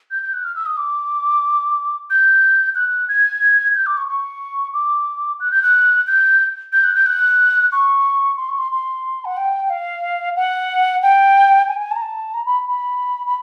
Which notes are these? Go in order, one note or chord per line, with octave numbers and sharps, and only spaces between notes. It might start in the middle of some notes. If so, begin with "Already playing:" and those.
G6
G6
F#6
F6
E6
D#6
D6
G6
F#6
G#6
G6
D6
C#6
C#6
D6
F#6
G6
F#6
G6
G6
F#6
G6
F#6
C#6
C6
C#6
C6
C6
F#5
G5
F5
F#5
G5
G#5
G#5
A5
A#5
A5
A#5
B5
B5
B5